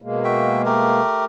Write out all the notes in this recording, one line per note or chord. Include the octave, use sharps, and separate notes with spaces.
B2 G#3 A#3
F#4 E5 G5
A3 G4 A#4